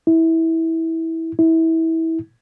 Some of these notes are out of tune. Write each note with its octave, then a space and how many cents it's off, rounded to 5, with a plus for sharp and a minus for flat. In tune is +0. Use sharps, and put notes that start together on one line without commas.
E4 -20
E4 -25